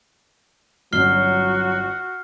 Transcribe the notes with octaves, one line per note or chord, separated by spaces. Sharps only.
G1 F#3 C#4 F#4 F6 C7 G7